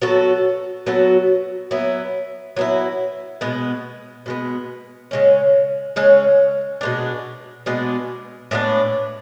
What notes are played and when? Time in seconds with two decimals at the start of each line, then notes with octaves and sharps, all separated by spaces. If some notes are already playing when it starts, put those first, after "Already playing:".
0.02 F#3 B3 F#4 A4
0.87 F#3 B3 F#4 A4
1.71 F#3 B3 E4
2.56 F#3 B3 E4
3.41 B2 G#3 B3
4.26 B2 G#3 B3
5.11 C#3 G#3 C#4
5.96 C#3 G#3 C#4
6.81 B2 G#3 B3 D4
7.66 B2 G#3 B3 D4
8.51 A2 G#3 B3 D4